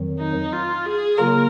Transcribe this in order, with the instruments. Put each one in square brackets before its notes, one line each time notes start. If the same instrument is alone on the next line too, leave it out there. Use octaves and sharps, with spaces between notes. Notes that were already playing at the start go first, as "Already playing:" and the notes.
Already playing: [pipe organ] F2 D#3 F#3
[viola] D#4
F4
G#4
[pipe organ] C#3 F#3 A#3 F4 [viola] A#4